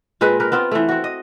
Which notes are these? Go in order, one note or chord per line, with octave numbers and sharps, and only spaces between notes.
A#2 G#3 C4 B4
G4 A#4 B4
B3 C4 F4
E3 A3
C4 F#4
D#5